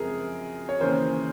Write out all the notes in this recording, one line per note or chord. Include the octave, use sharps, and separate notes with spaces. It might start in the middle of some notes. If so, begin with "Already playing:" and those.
Already playing: F#2 C#3 F3 G#3 C4 G#4 A#4
C#5
D#2 C#3 E3 A#4 C5